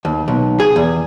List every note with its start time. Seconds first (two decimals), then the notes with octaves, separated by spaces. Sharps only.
0.05 D#2
0.28 B1
0.60 G#4
0.76 E2